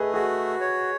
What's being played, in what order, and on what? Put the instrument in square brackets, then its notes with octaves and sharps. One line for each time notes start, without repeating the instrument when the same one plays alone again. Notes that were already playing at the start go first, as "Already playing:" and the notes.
Already playing: [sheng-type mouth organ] A3 [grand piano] G#4 B4 D#5
[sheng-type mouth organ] F#4 [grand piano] G#4
[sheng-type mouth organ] C#5